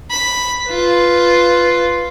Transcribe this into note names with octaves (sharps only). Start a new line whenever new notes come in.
B5
F4 B4